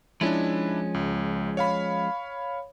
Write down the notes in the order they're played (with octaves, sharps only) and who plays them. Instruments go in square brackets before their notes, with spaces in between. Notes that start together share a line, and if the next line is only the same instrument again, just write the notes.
[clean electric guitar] F3 G#3 C#4 [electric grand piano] D4 E4
[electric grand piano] C#2
C#5 F5 B5